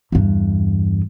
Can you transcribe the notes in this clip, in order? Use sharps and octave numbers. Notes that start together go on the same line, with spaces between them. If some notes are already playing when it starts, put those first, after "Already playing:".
E2 G2